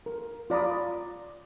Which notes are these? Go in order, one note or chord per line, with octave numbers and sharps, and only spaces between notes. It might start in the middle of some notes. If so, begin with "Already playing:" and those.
A#4
F4 D5 A#5 B5 D#6